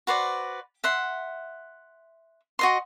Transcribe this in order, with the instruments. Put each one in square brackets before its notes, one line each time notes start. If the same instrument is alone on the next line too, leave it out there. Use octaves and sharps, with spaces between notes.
[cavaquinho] F#4 B4 C5 D5
E5 F#5 C6
F#4 D#5 C6